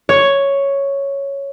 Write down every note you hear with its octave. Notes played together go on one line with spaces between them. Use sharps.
C#5